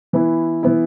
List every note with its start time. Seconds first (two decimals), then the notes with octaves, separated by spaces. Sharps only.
0.13 E3 B3 E4
0.63 E3 B3 E4